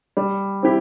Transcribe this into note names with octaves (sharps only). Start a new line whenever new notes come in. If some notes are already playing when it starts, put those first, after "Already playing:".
G3
C4 E4 G4